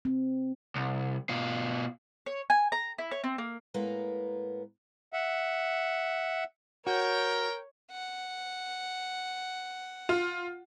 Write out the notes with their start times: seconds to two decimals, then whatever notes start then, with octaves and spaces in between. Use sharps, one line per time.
0.05 C4
0.75 C2
1.30 B2 F4
2.26 C#5
2.50 G#5
2.72 A#5
2.98 E4
3.11 C#5
3.24 C4
3.38 A#3
3.74 A2 G#3 A#3 B3 B4 A#5
5.13 E5 F#5
6.87 F#4 A#4 C#5 G5
7.91 F#5
10.09 F4